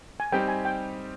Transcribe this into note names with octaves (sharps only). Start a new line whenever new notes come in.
G#5
G3 C4 D#4 G4 G5
G#5
G5